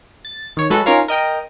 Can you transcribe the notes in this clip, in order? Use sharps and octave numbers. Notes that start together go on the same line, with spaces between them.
A6
D#3 C#5
F#3 G#3 F#4 A4 B4
C#4 D#4 F4 A#4 C#5 F5
A#4 D#5 G5